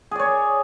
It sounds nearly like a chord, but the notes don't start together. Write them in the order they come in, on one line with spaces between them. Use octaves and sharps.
G#4 D5 C#5